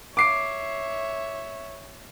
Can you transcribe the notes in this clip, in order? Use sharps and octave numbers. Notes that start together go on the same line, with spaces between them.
C#5 E5 D6 C7 D7